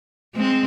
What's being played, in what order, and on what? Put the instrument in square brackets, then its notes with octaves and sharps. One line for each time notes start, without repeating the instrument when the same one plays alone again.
[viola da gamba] G#3 C4